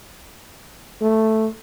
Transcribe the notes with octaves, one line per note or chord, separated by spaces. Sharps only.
A3